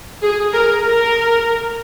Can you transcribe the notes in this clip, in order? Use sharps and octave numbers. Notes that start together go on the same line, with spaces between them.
G#4
A#4
A#4